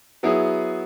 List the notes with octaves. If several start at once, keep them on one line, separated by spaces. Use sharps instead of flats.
F#3 B3 E4 G#4